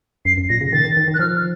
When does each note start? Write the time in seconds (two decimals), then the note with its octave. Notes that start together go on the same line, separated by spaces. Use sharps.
0.25 F#2 C7
0.38 F#2
0.50 A#2 A#6
0.61 C#3
0.73 D#3 A6
0.85 D#3
0.97 D#3
1.08 D#3
1.14 F#6
1.19 F3 F6